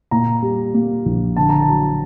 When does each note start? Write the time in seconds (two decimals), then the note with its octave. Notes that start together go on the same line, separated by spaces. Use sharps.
0.11 A#2 A#5
0.42 G3
0.74 A#3
1.05 A#1
1.36 D3 A5
1.50 A#5
1.62 A5
1.68 F#3